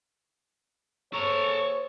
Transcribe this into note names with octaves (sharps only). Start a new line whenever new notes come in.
A#3 G#4 A4 C5 C#5 A#5 C#6